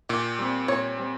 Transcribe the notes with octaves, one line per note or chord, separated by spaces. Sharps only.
A#2 G4
G3 C4
A#2 C#5
G3 C4